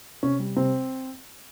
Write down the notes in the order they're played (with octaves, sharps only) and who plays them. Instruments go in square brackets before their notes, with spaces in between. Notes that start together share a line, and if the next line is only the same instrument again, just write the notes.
[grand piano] C3 C#4
G3
C3 C4